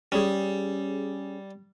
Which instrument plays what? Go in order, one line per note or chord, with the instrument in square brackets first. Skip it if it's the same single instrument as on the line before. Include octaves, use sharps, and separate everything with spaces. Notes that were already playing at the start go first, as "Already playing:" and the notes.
[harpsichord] G3 [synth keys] C#4 G#4